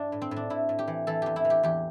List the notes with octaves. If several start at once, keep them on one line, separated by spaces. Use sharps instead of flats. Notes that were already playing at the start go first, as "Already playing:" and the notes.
Already playing: G2 D4 E4
A2
C4
A2
D4
A2 E4
A2
G4
E3
E3 A4
E2 G4
E4
E3
G4
E2 G4